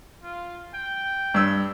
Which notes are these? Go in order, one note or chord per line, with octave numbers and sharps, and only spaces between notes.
F4
G5
G2 E6